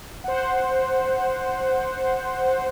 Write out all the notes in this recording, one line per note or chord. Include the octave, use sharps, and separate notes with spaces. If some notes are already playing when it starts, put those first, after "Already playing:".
C5 F#5